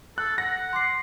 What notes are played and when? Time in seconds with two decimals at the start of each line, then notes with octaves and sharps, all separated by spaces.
0.18 A4 F#6
0.38 F#5 A#6
0.73 C6 D6 C7